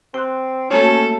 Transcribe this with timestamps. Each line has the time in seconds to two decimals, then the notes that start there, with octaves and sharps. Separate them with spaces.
0.14 C4 G5 C6 F#6
0.70 A3 A#3 C#4 F#4 A4 C#5